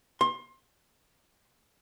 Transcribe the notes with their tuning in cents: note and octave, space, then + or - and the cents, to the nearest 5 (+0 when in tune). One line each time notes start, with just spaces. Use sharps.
C6 +30